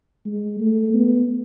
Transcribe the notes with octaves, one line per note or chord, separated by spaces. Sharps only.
G#3
A3
B3